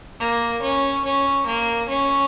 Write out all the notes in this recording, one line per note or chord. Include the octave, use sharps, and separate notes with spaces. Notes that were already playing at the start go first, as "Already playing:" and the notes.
A#3
C#4
C#4
A#3
C#4